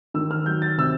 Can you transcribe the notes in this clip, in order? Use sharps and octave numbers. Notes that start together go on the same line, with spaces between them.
D#3 E6
F6
F#3 G6
A6
C3 E6